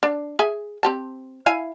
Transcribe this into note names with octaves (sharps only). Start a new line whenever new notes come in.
D4
G#4 E5 G#5
C4 G4 A5
E4 F5 G#5